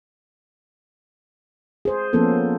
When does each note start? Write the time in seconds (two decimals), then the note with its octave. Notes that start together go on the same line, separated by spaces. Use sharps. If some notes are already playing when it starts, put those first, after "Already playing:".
1.85 G#4 C5
2.13 F3 A#3 B3 C#4 A4